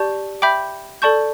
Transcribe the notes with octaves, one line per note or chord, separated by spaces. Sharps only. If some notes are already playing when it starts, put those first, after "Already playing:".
Already playing: G4 D5 A5 C#6 G6
E5 G5 B5 D6 G6
A4 D5 A5 C#6 G6